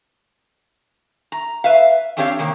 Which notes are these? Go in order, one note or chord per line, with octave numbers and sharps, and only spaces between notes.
A#5
B4 E5 F5
E2 C4 D4 G4 C#5 F5
C3 D#3 A#3